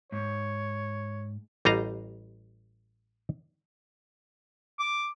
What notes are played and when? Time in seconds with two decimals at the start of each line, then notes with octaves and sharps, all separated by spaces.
0.12 G#2 C#5
1.65 A1 G3 F#4 D#5 F5 A#5
4.79 D6